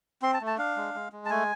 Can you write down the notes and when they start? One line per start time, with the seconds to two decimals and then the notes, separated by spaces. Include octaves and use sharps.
0.22 C4 C6
0.34 A5
0.41 A3
0.47 A5
0.58 D4 F5
0.76 G#3
0.94 G#3
1.12 G#3
1.25 A5
1.30 A3 G#5